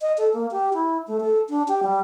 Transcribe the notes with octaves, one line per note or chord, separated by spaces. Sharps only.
D#5
A4
A#3
G4
E4
A3
A4
D4
G4
G3